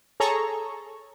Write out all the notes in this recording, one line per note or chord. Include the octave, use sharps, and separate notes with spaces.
G#4 A4 C#5 A#5 C#6